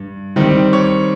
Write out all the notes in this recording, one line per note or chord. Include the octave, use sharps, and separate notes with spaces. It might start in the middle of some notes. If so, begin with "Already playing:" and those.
Already playing: G2
D#3 G3 C4
C#5